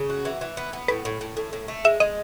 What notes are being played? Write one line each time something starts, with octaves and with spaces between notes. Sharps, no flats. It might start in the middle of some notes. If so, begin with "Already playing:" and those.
Already playing: C#3
F#4
E3
E3
B3
B3
A2 B4
A2
A2
A2
A2
A3
G#3 E5
G#3 D#5